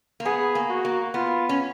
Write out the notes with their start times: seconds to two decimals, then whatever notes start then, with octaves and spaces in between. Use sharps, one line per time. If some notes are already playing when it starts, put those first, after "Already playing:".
0.20 A#3
0.25 B3 G#4
0.55 A#3
0.69 F#4
0.85 A#3
1.14 B3 F4
1.49 C#4